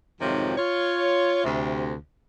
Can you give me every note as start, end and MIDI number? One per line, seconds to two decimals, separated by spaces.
0.21 0.56 41
0.21 0.56 44
0.21 0.56 48
0.21 0.56 51
0.21 0.56 53
0.21 0.56 54
0.57 1.41 65
0.57 1.41 73
1.44 1.95 38
1.44 1.95 48